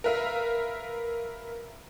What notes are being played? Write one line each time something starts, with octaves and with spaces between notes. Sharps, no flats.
A#4 B4 E5 F5